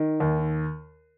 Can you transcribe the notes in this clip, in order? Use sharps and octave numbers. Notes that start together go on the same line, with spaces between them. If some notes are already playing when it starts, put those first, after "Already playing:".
Already playing: D#3
D#2